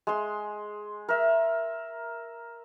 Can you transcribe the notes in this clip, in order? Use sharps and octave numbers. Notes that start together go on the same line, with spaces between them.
G#3 C6
A#4 E5